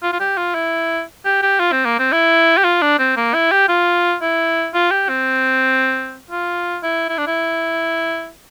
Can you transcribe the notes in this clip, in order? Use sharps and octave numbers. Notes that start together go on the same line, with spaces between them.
F4
F4
G4
F4
E4
G4
G4
F4
C4
A#3
C4
E4
G4
F4
D4
C4
A#3
E4
G4
F4
E4
F4
G4
C4
F4
E4
E4
D4
E4